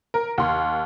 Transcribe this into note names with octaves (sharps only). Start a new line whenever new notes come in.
A#4
D#2 C6